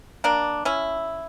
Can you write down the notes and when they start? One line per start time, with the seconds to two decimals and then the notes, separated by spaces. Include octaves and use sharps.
0.24 A#3 D4
0.65 C#4 E4